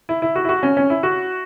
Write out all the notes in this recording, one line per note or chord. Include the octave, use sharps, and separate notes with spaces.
E4
E4
F#4
E4
F#4
C#4
C#4
E4
F#4